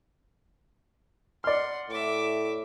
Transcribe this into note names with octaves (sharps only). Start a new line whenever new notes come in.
D5 F#5 C6 F6
A2 E5 D6